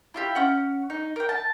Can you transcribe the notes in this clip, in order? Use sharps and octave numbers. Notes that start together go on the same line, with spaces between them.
E4 F4 G4
C#4 F#5
D#4
A#4 G5
A5